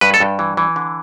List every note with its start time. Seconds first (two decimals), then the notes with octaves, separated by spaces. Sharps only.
0.01 G2 B4
0.14 A4
0.20 G2
0.39 E3
0.57 E3
0.76 D3